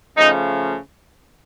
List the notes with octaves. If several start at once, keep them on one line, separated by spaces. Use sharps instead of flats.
C#3 F3 A3 D#4